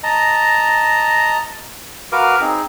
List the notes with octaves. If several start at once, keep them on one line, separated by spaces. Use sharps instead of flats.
D#5 A5 A#5
F#4 A#4 B4 F5 D6
C4 D#4 G#4